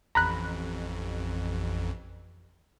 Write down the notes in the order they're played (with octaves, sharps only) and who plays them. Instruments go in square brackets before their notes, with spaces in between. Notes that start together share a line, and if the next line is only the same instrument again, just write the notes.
[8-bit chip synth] A1 F2 [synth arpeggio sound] A#5 B5 F#6